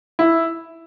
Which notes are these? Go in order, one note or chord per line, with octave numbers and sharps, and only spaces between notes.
E4